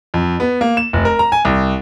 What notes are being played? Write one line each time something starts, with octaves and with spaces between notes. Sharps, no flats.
F2
B3
A#3
E7
F1
A#4
A#5
G#5
C2